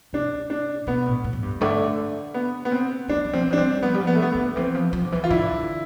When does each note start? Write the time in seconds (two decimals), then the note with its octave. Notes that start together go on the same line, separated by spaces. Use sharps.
0.13 C3 D4
0.50 D4
0.87 B2 B3
1.06 A2
1.24 A2
1.33 F2
1.42 G2
1.61 D3 A3
2.34 B3
2.65 B3
2.72 C4
3.08 E3 D4
3.16 F3
3.25 E3
3.33 F3 C4
3.42 E3
3.50 F3 D4
3.58 G3 C4
3.83 F3 B3
3.94 G3
4.01 F3
4.07 B3
4.15 A3
4.19 E3 B3
4.32 E3 B3
4.38 D3
4.56 E3 C4
4.75 F3
4.93 F3
5.04 D3
5.12 E3
5.24 F4
5.30 D3 E4